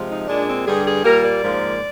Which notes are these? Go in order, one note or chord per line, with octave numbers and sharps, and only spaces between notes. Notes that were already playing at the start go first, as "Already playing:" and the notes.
Already playing: C3 F3 G#3
D#4
A#2 G#3 D4
C4
G2 D3 G3 G#4
G#4
A#2 G3 A#3 A#4
D5
G#2 F3 A#3